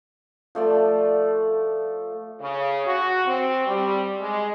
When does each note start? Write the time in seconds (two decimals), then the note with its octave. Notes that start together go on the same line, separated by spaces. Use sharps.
0.55 F3 A3 D5
2.40 C#3
2.85 F#4
3.27 C4
3.66 G3
4.20 G#3